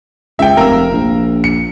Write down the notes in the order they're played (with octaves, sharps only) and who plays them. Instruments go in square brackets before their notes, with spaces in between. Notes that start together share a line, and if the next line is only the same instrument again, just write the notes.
[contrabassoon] C#2 [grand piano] E5 G5
[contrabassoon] F1 [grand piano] A#4 F5 E6
[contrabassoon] A#1
[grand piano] C#7